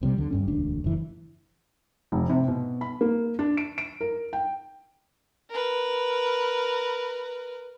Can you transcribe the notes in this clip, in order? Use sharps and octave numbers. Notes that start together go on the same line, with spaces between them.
B1 C3 F3 G3
D#2 D3
G#1 G2 C#4
E1 D2 D4
F#1 E3
F1
C3
B2
B5
A#3
D4
D7
D7
A#4
G5
A#4 B4